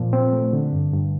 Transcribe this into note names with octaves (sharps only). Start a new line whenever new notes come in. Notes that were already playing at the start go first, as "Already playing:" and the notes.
Already playing: A#2 F3
C4
A3
D3
G2
G2